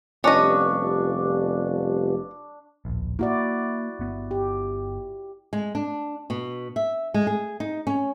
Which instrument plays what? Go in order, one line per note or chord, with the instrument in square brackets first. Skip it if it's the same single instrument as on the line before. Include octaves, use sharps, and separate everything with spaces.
[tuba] F1 [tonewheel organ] G3 B3 F4 [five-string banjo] C#4 D#5 [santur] D4 C#6
[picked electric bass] D1 A#1
[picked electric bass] A#3 [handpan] E4 F#4 D5
[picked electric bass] G1 B3
[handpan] G4
[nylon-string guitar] G#3
D4
B2
E5
G#3
G#4
D#4
C#4